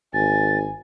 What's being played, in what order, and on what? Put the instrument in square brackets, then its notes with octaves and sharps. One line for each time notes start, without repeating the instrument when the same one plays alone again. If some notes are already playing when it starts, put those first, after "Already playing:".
[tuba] G#1 [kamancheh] G#5 [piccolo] A6